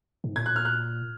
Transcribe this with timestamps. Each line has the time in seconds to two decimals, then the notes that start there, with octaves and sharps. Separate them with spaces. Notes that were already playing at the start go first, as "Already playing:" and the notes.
0.24 G#2
0.35 A#2 G#6
0.46 F#6
0.56 F6
0.65 F#6